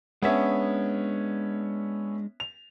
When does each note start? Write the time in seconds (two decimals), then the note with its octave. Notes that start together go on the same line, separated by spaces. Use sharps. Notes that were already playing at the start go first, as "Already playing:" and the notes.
0.22 G#3 B3 C#4 D4 E5
2.40 F7